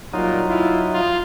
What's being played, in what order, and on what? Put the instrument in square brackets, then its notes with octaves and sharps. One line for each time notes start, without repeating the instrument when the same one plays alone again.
[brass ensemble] A#2 G3 F4 [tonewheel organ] F#3 D#4
[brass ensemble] E4 F4
F4